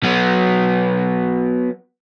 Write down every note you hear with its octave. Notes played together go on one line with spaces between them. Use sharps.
F#3 B3